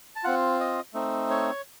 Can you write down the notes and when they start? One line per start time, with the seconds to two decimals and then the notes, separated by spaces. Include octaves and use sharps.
0.16 A5
0.24 C4 F4 F#5
0.60 D#5
0.94 A3 C4 D#4
1.30 C#5